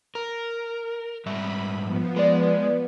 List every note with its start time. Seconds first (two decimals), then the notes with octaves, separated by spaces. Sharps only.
0.15 A#4
1.26 G#2 G3 E5 B5
1.82 F3 B3
2.16 G#3 B4 D5